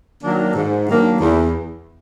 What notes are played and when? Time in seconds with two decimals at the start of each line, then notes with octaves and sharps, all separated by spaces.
0.23 D#3 F#3 A#3 D4
0.55 G#2
0.87 D#3 F#3 A#3 D4
1.20 E2